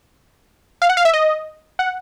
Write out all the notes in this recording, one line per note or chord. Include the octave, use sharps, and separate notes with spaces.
F5
F#5
F5
E5
D#5
F#5